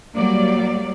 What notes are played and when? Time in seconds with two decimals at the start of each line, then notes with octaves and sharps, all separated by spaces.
0.14 F#3 G3 A#3 D5